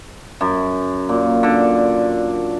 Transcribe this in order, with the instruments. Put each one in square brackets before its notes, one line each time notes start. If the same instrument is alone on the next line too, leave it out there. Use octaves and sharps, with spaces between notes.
[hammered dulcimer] F#2
A#2
D3